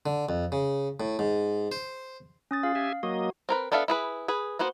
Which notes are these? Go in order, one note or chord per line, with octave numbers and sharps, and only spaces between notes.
D3
F2
C#3
A2
G#2
C5
C#4 D#6 A6
F4 G#4 F5
G4 E5 G#5
F#3 A#3 F#4 D#5
C4 A#4 B4
B3 D4 A4 E5 F5
E4 G#4 B4
G#4 B4
A#3 B3 F#4 C5